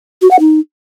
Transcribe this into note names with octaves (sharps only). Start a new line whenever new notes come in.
F#4
F#5
D#4